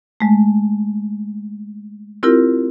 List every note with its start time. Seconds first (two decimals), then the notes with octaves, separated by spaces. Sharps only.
0.20 G#3 A3
2.23 C4 E4 F4 G4 A#4